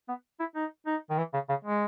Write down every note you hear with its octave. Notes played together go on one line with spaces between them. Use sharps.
B3
E4
D#4
D#4
D#3
E3
C#3
C#3
G#3